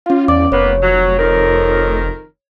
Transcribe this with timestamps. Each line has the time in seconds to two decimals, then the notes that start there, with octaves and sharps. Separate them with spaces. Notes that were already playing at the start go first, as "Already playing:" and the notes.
0.06 C#4 F4 F5
0.28 E2 D5 D6
0.52 F1 A#3 B3 C#5
0.82 F#3
1.19 F2 D#3 A#4